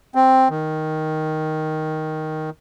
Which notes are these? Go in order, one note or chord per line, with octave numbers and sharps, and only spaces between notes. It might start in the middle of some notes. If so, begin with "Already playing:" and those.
C4
D#3